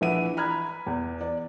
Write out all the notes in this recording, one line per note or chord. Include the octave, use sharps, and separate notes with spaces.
A#1 E3 E5 F#5 D#7
A#5 B5 F6 F#6 G#6
B5
E2
D5